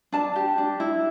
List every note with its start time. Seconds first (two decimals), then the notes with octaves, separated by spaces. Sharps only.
0.12 D4 A5
0.36 G4
0.58 D4
0.80 E4